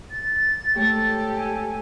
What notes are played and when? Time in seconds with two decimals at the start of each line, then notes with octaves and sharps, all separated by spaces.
0.11 A6
0.75 G#2 A3 G4 A4 C#5
1.34 G#5